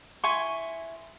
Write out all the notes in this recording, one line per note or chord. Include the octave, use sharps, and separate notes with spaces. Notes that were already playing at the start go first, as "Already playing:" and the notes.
E4 G#5 C6 C#6